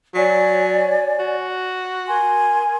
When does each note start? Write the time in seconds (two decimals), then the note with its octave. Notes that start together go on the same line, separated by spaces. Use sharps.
0.15 F#3 C#5 D5 G#5
1.19 F#4
2.07 A#4 G#5 C6